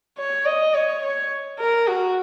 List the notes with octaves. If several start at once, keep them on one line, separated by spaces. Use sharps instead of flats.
C#5
D#5
C#5
C#5
A#4
F#4